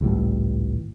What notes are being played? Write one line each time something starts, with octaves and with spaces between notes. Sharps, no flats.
G#1 C#2 A2 G3